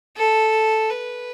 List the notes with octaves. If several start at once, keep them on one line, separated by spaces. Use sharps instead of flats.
A4
B4